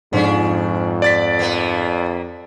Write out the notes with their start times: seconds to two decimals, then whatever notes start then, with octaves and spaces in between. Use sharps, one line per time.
0.13 F2 G#2 F3 C#4 D4
1.02 D5 A6 B6
1.39 A#3 B3